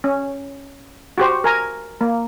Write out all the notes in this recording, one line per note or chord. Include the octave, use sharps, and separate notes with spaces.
C#4
F#4 G4 C5
A#4 G#5 A#5
A#3